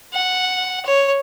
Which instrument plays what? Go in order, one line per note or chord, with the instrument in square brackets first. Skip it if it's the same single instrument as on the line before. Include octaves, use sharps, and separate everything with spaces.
[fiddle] F#5
C#5